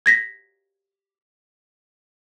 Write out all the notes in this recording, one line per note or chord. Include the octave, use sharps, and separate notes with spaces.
G#6 A#6 B6